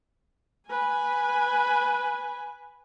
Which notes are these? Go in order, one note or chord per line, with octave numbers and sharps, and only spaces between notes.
B4 G#5